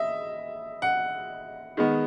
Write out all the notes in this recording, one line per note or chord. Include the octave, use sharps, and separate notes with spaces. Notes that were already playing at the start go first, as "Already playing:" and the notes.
Already playing: D#5 E5
F#5
D#3 G#3 B3